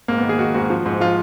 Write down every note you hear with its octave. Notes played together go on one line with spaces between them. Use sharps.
G#2 A#3
B3
D#3
G#4
D#3 F#4
G#2 F#4
F3
G#2
F3 F4